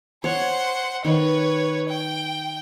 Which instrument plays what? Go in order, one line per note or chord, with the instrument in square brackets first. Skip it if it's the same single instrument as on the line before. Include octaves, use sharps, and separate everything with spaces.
[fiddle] C5 F#5 [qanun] C#5
[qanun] D#3 [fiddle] B4 C#5
[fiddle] G5